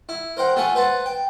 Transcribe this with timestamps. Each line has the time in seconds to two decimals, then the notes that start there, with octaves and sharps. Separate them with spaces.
0.09 E4
0.37 A#4 C5 F#5 G5
0.56 A3 F4 F#5 G#5 A5
0.75 B4 C5 F#5 A5
1.06 G5